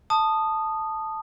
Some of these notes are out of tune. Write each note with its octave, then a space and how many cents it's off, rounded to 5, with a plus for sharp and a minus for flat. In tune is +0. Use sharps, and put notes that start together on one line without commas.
A5 +0 D#6 -10